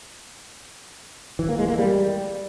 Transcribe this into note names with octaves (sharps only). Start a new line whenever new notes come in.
E3
A#3
G#3
A#3
G3